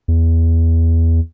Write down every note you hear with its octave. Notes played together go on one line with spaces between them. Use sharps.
E2